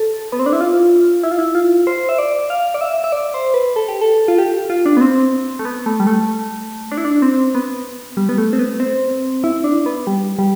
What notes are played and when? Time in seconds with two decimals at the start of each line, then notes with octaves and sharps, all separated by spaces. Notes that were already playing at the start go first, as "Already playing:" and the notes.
Already playing: A4
0.32 B3
0.39 C4
0.46 D4
0.53 E4
0.60 F4
1.23 E4
1.31 F4
1.39 E4
1.55 F4
1.87 C5
2.09 E5
2.18 D5
2.50 F5
2.74 D5
2.81 E5
3.04 E5
3.12 D5
3.34 C5
3.54 B4
3.76 A4
3.88 G4
4.01 A4
4.28 F4
4.38 G4
4.70 F4
4.86 D4
4.97 B3
5.01 C4
5.59 A3
5.65 B3
5.86 A3
6.00 G3
6.07 A3
6.92 D4
6.97 E4
7.05 D4
7.22 C4
7.55 B3
8.17 G3
8.29 B3
8.38 A3
8.53 C4
8.59 B3
8.80 C4
9.44 E4
9.64 D4
9.86 B3
10.07 G3
10.39 G3